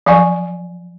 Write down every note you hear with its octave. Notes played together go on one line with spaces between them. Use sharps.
F3 F#3 D5 F5 G#5 C#6